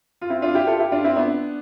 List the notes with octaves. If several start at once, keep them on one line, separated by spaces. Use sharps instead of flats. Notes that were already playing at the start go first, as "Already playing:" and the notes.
F4
C4 E4
D4 F4
E4 G4
F4 A4
E4 G4
D4 F4
C4 E4
B3 D4